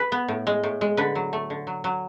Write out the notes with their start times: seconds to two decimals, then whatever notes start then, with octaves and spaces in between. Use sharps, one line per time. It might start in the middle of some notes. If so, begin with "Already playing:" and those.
Already playing: B4
0.12 B3
0.28 A2
0.47 G#3
0.64 A2
0.81 G#3
0.97 D3 B4
1.15 F#3
1.33 A3
1.50 D3
1.67 F#3
1.84 F#3